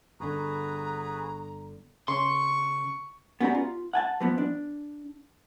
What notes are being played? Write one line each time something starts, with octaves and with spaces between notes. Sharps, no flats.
G1 D3 F#4 G#4 B4 A#5
C#3 C6 C#6
B3 C#4 F#4 G4 D5 A#5
F4
F#5 G#5 A5
E3 F3 B3
D4